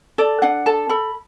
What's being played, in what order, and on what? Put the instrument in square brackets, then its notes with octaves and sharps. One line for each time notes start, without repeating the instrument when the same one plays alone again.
[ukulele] A4 D5
D4 F#5
A4 A5
A4 B5